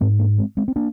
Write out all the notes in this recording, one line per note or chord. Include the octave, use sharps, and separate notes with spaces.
G#2 G#3 C4
A#3 D4
G#3 C4
G#3 C4
C4
A#3 D4